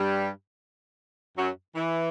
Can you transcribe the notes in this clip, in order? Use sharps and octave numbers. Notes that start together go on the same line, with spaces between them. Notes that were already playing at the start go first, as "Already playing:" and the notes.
Already playing: G2 G3
F#2 F#3
E3